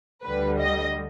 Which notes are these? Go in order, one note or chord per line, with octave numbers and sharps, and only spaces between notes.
D2 D3 G3 B4
D#5